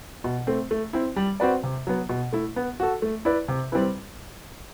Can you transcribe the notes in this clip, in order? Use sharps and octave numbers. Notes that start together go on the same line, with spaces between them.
B2
A3 C4
A3
C4 E4
G3
C4 F#4 B4 D5
C3
F#3 B3
B2
A3 E4
B3
F#4 A4
A3
E4 B4 D5
C3
G3 C4 E4 B4